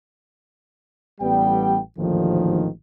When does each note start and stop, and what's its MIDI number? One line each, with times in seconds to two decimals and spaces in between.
1.21 1.78 33
1.21 1.78 55
1.21 1.78 59
1.21 1.78 79
1.98 2.67 33
1.98 2.67 39
1.98 2.67 44
1.98 2.67 50
1.98 2.67 51
1.98 2.67 53